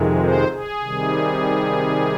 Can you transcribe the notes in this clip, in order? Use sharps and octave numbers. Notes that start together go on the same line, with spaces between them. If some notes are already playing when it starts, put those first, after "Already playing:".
Already playing: F2 C3 D#3 G#3
C5
G#4
C3 D#3 G3